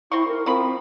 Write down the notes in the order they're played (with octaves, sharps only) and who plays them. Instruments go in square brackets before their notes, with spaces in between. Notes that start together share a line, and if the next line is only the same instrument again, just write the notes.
[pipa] C4 C6 C#6 [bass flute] E4
[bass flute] A#4
[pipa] D#3 F3 B5 [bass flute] C4